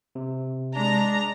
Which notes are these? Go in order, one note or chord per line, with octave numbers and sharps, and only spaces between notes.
C3
G#3 D4 A#5